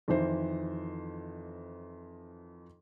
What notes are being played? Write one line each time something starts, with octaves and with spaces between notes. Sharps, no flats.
F2 D#3 E3 C5